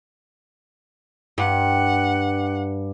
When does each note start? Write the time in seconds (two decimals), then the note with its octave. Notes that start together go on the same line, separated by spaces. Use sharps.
1.38 G2 F#5